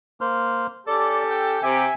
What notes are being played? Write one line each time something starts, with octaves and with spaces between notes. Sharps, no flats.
A#3 C5 F6
C#4 G4 A4 D5
G5
C3 G4 E5 G#5